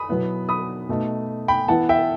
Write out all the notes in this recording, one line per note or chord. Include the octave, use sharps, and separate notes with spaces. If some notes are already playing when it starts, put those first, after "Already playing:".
Already playing: B5 D#6
B2 F#3 B3 E4
B5 D#6
B2 A3 D#4
G5 B5
E3 B3 E4 F#5 A5
E5 G5